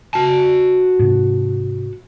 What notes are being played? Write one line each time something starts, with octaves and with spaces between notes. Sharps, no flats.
F#4 A5
G#2 C3